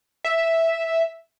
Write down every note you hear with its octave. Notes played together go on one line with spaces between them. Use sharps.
E5